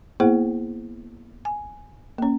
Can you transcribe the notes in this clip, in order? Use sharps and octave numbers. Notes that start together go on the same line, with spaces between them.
A#3 B3 E4 G#4 C5 F#5
G#5
A#3 C#4